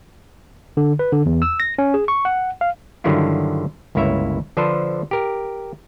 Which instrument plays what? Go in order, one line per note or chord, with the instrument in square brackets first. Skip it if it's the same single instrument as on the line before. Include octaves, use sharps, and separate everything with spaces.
[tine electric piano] D3
B4
D3
E2
E6
A#6
C#4
G#4
C#6
F#5
F5
[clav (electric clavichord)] G2 D3 D#3 F#3 E4 F4
G1 C#2 A#3 E4 C#5 E5
D3 F3 D4 A4 B4 C5
G4 A#4